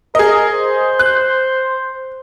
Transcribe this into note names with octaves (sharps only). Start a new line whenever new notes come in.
G#4 A#4 D#5
C5
F#6